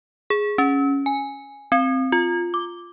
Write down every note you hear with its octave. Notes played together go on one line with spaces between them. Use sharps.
G#4
C#4
G#5
C4
F4
D6